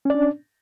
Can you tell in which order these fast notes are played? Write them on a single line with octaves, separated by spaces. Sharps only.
C#4 D5 D4